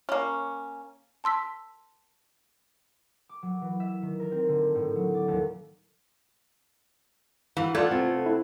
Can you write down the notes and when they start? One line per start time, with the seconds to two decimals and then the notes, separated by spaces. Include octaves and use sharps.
0.09 A#3 C#4
1.24 A5 C6 E6 B6
3.29 D6
3.43 F#3
3.61 E3
3.80 E5
4.02 D#3
4.20 A#4
4.32 C4
4.49 D3
4.75 A2
4.96 F#3
5.14 D5
5.28 D#2
7.57 E3 F#4 F5
7.75 A3 B3 F4 D5 G#6
7.91 C3 C4
8.26 E4